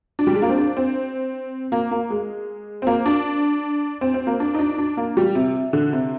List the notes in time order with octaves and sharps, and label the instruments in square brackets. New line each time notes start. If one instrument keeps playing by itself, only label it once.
[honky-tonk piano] D4
G3
G#3
A#3
C4
D4
C4
A#3
A#3
G#3
C4
A#3
D4
C4
C4
A#3
D4
D#4
D4
D4
A#3
G3
C3
D3
C3